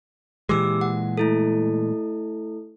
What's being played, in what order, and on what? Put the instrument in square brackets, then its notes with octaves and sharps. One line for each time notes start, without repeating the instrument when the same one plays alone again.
[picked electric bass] A#2 E3 G#3 [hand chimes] G4 D6 E6
[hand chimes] F#5
A3 E4 A4